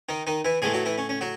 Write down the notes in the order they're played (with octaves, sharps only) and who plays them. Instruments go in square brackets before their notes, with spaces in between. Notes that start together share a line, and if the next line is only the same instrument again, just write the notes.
[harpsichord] D#3 D#4
D#3 D#4
E3 E4
A2 E3 G#3 A3 G#4
F#3 F#4
E3 E4
C#4
C#4
F#3 F#4